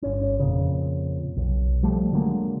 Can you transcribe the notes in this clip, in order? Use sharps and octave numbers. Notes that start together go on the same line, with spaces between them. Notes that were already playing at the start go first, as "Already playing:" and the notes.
G1 C#4
F2 A#2 C#3
B1
F3 G3 A3
D3 F#3 G#3 A#3